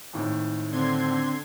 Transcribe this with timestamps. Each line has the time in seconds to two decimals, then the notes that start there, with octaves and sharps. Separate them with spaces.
0.13 G#1 A2 D#3
0.71 D3 C4 C6 G#6